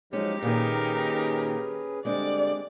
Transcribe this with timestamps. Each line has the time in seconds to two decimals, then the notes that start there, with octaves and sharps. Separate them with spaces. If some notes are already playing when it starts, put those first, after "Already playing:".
0.13 F3 F#3 G#3 C#4 D#4 G4
0.42 A#2 D#3 C#4 D#4 G#4 A#4 B4
2.05 D3 G3 G#3 C4 D4 D5